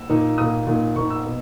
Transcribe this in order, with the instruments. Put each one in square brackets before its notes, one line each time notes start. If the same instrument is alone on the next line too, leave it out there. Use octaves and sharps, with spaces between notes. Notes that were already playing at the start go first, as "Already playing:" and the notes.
Already playing: [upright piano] E6
A#2 A#3 D#4
A#2 A#3 D#4 D#6
A#2 A#3 D#4
A#2 A#3 D#4 C#6
E6
B2